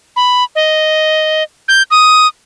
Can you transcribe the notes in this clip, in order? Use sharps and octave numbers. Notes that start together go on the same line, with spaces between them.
B5
D#5
G6
D#6